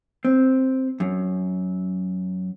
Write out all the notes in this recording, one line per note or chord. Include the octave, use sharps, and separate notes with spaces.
C4
F#2